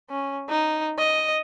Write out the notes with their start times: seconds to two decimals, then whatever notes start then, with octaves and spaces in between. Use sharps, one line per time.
0.11 C#4
0.49 D#4
0.98 D#5